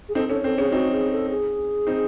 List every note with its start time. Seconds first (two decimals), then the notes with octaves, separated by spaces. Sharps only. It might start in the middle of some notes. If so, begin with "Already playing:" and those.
0.09 G#4
0.15 C4 D#4 A4
0.29 C#4 A4
0.44 C4 A4
0.58 C#4 G#4
0.72 C4 D#4 F#4
0.92 G#4
1.11 A4
1.30 G#4
1.87 C4 D#4